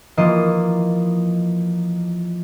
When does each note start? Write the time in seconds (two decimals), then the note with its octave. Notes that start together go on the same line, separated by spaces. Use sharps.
0.18 E3 F3 A#3 C5 D#5